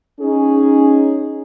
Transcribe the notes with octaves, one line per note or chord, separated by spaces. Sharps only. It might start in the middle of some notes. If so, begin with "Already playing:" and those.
C#4 D#4 G#4